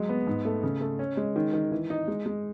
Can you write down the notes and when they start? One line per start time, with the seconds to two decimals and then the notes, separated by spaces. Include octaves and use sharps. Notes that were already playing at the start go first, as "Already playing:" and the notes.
Already playing: F#3 G#3
0.09 B3
0.27 G#2
0.45 A3
0.63 C#3
0.81 A3
0.99 C#4
1.17 G#3
1.36 D#3
1.53 D#3
1.71 E3
1.90 D#4
2.08 G#3
2.26 G#3